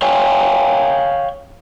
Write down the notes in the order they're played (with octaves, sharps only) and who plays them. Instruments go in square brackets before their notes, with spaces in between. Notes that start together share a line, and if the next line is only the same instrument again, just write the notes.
[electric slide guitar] C#5 F5 G5 G#5